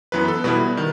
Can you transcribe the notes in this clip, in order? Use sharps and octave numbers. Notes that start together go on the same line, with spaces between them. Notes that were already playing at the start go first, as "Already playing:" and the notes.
F#2 E3 B3 B4
A4
B2 G3 B3 E4 B4
D#3